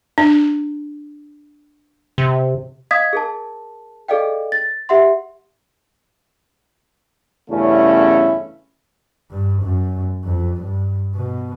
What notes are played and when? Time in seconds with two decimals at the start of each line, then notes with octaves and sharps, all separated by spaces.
0.18 D4
2.18 C3
2.91 D#5 F5 D#6 G#6 B6
3.13 G#4 A#4 A5
4.08 G#4 A4 D5 D#5 F5 G5
4.52 A6
4.89 G4 E5 F#5 C6
7.51 E2 G2 C#3 A3 C#4 E4
9.31 G2
9.63 F#2
10.25 F2
10.61 G2
11.15 B2